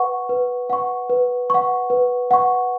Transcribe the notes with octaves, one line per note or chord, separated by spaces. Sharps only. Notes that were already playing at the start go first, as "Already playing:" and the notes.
Already playing: B4 F#5 C#6
B4
F#5 C#6
B4
F#5 C#6
B4
F#5 C#6